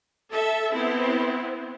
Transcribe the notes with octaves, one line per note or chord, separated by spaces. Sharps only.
A4 E5
B3 C4 E4